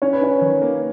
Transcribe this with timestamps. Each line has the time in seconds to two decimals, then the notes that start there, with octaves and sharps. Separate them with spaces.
0.02 C#4 C#5
0.13 B4
0.21 C#4 C#5
0.41 D#3
0.62 A#3